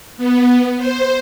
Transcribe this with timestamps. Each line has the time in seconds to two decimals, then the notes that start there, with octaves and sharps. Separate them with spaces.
0.17 B3
0.78 C5